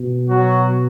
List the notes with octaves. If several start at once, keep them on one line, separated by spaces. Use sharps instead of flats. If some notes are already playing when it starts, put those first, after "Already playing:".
Already playing: B2
F#3 F#4